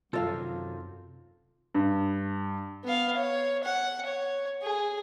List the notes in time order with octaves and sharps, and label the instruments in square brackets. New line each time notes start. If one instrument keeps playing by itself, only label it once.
[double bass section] F#2 [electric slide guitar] C3 D#3 F#3 [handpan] F4 [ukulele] A4 F5
[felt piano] G2
[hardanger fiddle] B3 F5
C#5
F#5
C#5
G#4